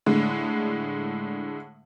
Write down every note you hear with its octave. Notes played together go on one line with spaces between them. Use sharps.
A2 D3 G#3